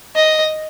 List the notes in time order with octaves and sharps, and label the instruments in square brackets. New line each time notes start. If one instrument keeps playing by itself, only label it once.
[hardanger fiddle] D#5